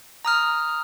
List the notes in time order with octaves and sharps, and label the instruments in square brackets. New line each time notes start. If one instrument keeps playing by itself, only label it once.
[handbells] A#5 D#6 F6